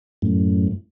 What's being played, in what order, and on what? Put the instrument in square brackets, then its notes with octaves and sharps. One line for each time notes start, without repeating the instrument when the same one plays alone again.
[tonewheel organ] F#2 A2